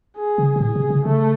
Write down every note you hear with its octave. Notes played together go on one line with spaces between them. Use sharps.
G#4
C#3
C3
A2 G#4
C3
C#3
C#3 A3